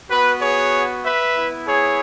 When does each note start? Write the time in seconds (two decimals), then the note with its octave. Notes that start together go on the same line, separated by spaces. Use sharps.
0.10 B3 F#4 B4
0.41 G#4 C#5
1.04 B4 E5
1.36 B3 E4
1.68 G#4 C#5